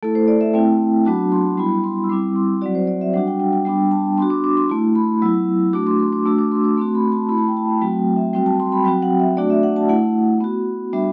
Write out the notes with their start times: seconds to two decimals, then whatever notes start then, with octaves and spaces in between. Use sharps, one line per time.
0.03 A3 E4 A4
0.15 C5
0.28 D5
0.41 E5
0.53 A3 C4 E4 G5
1.05 F#3 B3 D4 F#4 A5
1.32 C6
1.57 G3 B3 E4 B5
1.84 C6
2.04 E6
2.09 G3 C4 E4 D6
2.36 C6
2.61 F#3 C4 F#4 D5
2.75 C5
2.87 D5
3.01 E5
3.13 G3 D4 F#4 F#5
3.27 G5
3.40 G5
3.53 G5
3.65 G3 B3 D4 G5
3.91 A5
4.18 B3 D4 F#4 C6
4.30 D6
4.44 D6
4.57 C6
4.69 A3 E4
4.95 B5
5.22 F#3 B3 E4 E6
5.73 A3 D4 F#4 D6
5.87 C6
6.00 C6
6.13 D6
6.25 A3 D4 F#4 E6
6.38 D6
6.52 C6
6.64 D6
6.77 A3 C4 F#4 C6
6.95 B5
7.12 A5
7.29 A3 E4 B5
7.38 A5
7.48 G5
7.57 A5
7.81 F#3 A3 C4 F#4 G5
8.16 E5
8.33 G3 C4 F#4 G5
8.46 A5
8.60 C6
8.72 B5
8.85 F#3 C4 F#4 G5
9.02 F#5
9.20 E5
9.37 A3 D4 F#4 D5
9.50 E5
9.63 F#5
9.76 A5
9.89 A3 E4 F#5
10.41 B3 F#4
10.93 G3 B3 D4 F#4 E5